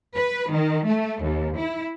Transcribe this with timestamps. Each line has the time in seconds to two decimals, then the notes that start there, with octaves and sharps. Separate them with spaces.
0.15 B4
0.52 D#3
0.87 A3
1.22 D#2
1.57 E4